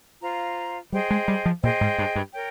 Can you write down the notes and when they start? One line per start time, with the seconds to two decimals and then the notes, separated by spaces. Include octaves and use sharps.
0.21 F4 C5 F5 A#5
0.92 G3 G#4 C5 D#5 G5
1.10 G#3
1.28 G3
1.46 F3
1.63 A#2 G#4 C5 D#5 G5
1.81 G#2
1.98 G2
2.16 G2
2.34 A#4 C#5 G5